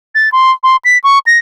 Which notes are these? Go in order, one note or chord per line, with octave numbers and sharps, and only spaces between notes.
A6
C6
C6
B6
C#6
A#6